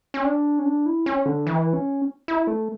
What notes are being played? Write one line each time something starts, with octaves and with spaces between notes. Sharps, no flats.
C#4
D4
C#4
D4
E4
C#4
D3
E3
C#4
E4
A3